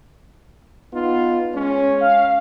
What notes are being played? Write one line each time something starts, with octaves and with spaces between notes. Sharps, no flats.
B3 D#4 F4
G#3 C#4
F5